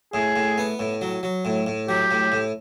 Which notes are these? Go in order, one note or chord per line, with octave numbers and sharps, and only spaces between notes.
A2 G#4
A2
B3
A2
F#3
F#3
A2
A2
F#3 G4
A2
A2